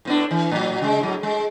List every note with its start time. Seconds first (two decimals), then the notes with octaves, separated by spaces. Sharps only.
0.05 A2 B3 D4
0.31 E3
0.51 A2 F#3
0.81 C#3 G#3
1.01 A2 F#3
1.23 G#3